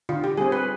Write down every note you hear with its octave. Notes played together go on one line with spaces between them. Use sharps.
D3 F4
G4
G3 C4 G#4
B4